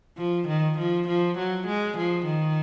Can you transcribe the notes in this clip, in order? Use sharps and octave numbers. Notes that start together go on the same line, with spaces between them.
F3
D#3
F3
F3
F#3
G#3
F3
D#3